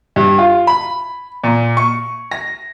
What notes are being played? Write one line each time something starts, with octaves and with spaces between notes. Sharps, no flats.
G2
F4
B5
A#2
C#6
A#6